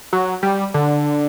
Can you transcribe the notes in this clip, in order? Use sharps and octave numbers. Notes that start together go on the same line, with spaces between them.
F#3
G3
D3